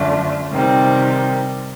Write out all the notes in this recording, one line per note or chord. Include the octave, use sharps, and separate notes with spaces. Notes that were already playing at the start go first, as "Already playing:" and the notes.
Already playing: F#2 D3 F3 A3 D4
C3 D#3 G3 C4